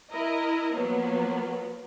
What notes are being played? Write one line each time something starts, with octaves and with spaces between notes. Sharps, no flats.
E4 A#4 D#5
F3 F#3 A#3 B3